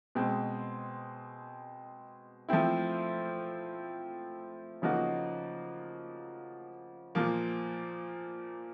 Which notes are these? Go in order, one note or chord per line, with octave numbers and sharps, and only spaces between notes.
B2 G#3 C4
F3 A3 C4 E4
C#3 F3 A#3 D#4 F#4
A#2 F3 A#3